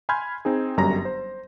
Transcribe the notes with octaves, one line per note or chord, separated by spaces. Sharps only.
G#5 B5 C6 F6 G6 G#6
C4 D#4 G#4
G1 F#2 G3 A#5 A#6
C5